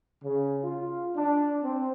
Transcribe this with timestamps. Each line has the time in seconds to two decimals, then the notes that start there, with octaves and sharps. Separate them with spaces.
0.24 C#3
0.64 F4
1.16 D4
1.62 C4